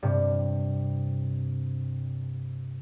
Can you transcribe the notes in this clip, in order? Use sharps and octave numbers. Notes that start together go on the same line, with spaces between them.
G2 C3